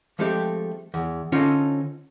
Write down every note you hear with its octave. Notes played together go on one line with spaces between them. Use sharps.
F3 G#3 A3 C4 G4
E2
D3 C4 C#4 D#4 F4 A4